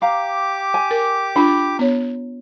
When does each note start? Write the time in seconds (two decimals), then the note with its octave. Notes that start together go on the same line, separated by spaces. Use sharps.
0.02 G4 F5 A#5 D6
0.74 G#5
0.91 A#4
1.36 D4 F4 B5
1.79 B3 C#5